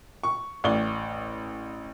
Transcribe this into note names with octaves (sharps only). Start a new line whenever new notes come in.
C#6
A1 D5 G7